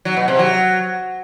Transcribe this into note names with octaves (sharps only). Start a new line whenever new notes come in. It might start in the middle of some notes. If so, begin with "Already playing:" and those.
F#3
B2
C3
F#3